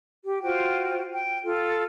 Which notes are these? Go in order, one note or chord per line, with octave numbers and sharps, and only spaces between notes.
G4
F4 F#4 C5 G5
G5
F4 A4